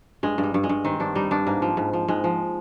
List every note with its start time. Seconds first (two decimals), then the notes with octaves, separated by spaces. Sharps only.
0.23 G2 G#3
0.38 G2
0.43 G3
0.54 G2
0.64 G#3
0.69 G2
0.84 D#3 C4
1.00 G2 D4
1.15 G3 D#4
1.31 G2 D4
1.47 G#2 A#3
1.62 F3
1.77 G#2
1.93 F3
2.08 G#2 G#3
2.24 F3